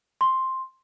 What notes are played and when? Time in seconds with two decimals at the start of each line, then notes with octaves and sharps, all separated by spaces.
0.21 C6